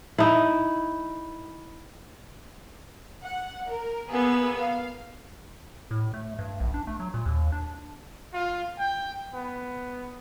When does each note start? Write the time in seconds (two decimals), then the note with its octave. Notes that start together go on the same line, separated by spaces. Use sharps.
0.18 D#4 E4
3.23 F#5
3.67 A#4
4.10 A#3 B3 G#4 E6
4.57 F5
5.91 A2
6.14 A3
6.39 G2
6.60 A#1
6.74 D4
6.87 A3
7.00 F#3
7.14 A#2
7.26 D#2
7.52 D4
8.34 F4
8.79 G5
9.34 B3